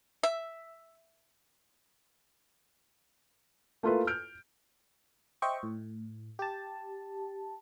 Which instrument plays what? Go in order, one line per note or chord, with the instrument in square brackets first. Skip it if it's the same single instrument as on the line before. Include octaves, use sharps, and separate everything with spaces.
[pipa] E5
[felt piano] A3 A#3 E4 F4 A4 B4
F6 G6 D7
[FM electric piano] C5 D#5 E5 G5 C#6
A2
G4 A5